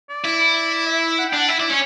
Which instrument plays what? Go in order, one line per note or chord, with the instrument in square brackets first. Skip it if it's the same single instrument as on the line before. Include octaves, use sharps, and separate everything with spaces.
[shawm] D5
[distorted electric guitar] E4
[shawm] E5
F#5
[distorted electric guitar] D4 [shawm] G5
[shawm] F#5
[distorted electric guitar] E4 [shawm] E5
[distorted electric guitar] E4 [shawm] D5
[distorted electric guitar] C#4 [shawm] C#5